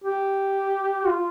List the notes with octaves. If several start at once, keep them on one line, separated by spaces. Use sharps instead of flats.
G4
F4